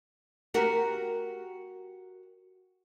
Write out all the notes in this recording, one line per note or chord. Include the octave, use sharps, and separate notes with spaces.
F#4 G4 A#4